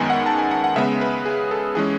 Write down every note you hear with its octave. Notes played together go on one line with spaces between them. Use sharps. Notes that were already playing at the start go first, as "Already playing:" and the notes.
Already playing: F#2 D#3 G#3 B3 G#5
F#5
A5
G#5
F#5
F#5
C#3 G#3 B3 E5
B4
G#4
A4
E3 G#3 C#4 G#4